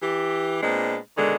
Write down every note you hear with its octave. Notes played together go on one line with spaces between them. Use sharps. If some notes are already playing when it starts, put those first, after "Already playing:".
E3 G4
A#2 G#3 B3 C4 D4
B2 D3 D#3 G#3 G#4